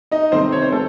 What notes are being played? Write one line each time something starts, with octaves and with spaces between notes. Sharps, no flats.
D#4 D#5
C3 D#3 A3 C4 C5
C#5
C5
D#3 A3 A4